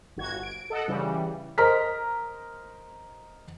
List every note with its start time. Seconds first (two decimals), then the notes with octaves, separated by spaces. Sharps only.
0.17 G1 F#4 G#6
0.43 D7
0.70 A4 D#5 F#5
0.88 C#3 E3 G3
1.58 A#4 C5 D#5 A#5 F6 B6